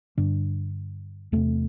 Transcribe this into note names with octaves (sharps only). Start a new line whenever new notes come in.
G2 D3 D4
E2 C3 A3